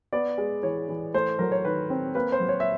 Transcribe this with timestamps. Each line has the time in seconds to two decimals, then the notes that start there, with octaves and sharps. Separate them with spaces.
0.13 B3 D5
0.38 G#3
0.63 E3 C#5
0.89 E3
1.14 A3 C5
1.39 F#3 A#4
1.52 C#5
1.65 D#3 B4
1.90 C4
2.15 A#3 B4
2.32 C5
2.40 F#3
2.49 C#5
2.60 E5